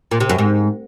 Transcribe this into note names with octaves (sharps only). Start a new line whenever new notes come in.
A#2
C3
F#2
G#2